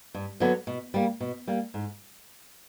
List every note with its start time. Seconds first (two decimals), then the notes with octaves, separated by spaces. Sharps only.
0.14 G2
0.40 D3 F#3 B3
0.67 B2
0.94 G3 A#3
1.20 B2
1.47 G3 A#3
1.74 G#2